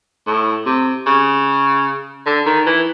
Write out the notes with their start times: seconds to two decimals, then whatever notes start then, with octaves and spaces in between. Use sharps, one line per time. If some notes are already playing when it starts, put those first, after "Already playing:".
0.27 A2
0.66 C3
1.06 C#3
2.26 D3
2.46 D#3
2.66 E3